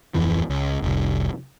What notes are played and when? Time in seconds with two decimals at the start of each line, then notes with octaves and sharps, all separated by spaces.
0.14 D1 F2 E3 F3
0.50 C#2
0.82 F1 C2